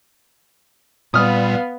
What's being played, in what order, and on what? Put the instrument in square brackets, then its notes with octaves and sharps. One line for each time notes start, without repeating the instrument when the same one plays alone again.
[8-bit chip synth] A#2 G3 [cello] B3 F5 [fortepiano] D#6 F6